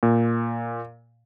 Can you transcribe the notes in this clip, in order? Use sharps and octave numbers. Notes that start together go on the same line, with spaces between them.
A#2